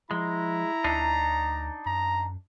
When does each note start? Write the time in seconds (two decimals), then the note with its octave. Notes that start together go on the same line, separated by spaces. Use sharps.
0.11 F3 G#3 E4 A#5
0.84 D2 D4 D#4
1.86 F#2 A#5